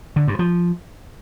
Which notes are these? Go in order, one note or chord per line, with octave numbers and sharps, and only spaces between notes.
D3
G2
F3